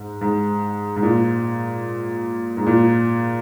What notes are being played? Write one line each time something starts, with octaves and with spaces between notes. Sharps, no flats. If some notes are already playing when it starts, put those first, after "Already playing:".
Already playing: G#2
G#2
G#2
A#2
G#2
A#2